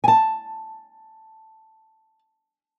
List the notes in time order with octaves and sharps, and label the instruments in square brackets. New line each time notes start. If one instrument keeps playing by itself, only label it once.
[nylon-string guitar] G#5 A5